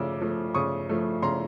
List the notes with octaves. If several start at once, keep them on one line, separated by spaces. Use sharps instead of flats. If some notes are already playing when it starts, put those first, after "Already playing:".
Already playing: C#3 F3 A3 D6 E6
F3 A3
C#3 C#6 D#6
F3 A3
C#3 A#5 C6